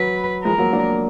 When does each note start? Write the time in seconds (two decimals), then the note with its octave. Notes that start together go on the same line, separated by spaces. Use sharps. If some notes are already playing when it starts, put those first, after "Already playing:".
Already playing: F#3 B4
0.44 F3 G#3 A#4
0.58 F#3 A#3
0.73 A#3 D4